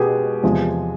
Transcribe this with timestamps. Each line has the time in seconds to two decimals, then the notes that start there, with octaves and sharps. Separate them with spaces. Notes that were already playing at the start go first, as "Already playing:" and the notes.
Already playing: B2 G#3 B3 G4 G#4
0.43 E2 C3 F3 G#3